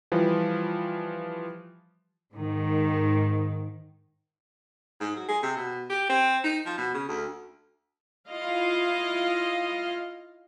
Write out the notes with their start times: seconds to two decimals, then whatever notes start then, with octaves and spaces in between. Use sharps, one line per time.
0.12 E3 F3 G3
2.32 G#2 D#3
5.00 G#2
5.16 F#3
5.29 G#4
5.43 C3
5.57 B2
5.90 G4
6.10 C4
6.44 D#4
6.66 F3
6.78 B2
6.94 C#3
7.09 D2
8.29 E4 F4 D#5 F5